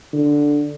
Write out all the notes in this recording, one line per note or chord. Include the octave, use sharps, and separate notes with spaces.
D3